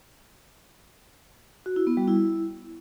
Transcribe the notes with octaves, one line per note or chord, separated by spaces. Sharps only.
F#4
E4
B3
G3
E4